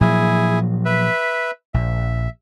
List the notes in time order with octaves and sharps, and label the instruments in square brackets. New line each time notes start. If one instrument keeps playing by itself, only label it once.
[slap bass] A#2 F3 F#3 [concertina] E4 G#4
[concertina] B4 E5
[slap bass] A#1 [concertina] E5